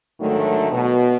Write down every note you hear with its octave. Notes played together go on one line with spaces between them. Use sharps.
G#2 D3 D#3 F#3 A3
B2